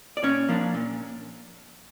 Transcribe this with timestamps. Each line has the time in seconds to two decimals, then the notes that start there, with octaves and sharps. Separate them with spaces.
0.17 D5
0.23 A#2 C#4 C#5
0.49 F3 A#3 D4
0.74 A#2